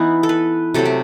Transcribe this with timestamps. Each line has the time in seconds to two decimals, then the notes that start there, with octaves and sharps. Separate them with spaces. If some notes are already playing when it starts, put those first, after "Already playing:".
Already playing: E3 B3 D#4 E4
0.23 A4
0.29 B4
0.74 C3 F#3 A3 A4
0.85 G4